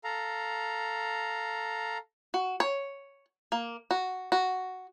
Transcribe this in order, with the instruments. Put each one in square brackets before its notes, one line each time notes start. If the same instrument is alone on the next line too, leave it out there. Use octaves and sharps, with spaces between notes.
[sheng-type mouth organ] A4 F5 A#5
[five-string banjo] F#4
C#5
A#3
F#4
F#4